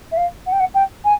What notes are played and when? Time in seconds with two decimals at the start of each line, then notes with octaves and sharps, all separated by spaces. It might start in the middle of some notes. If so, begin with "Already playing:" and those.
0.11 E5
0.17 F5
0.46 F#5
0.52 G5
0.60 F#5
0.74 G5
1.04 G#5